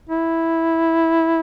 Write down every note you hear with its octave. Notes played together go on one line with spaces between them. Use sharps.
E4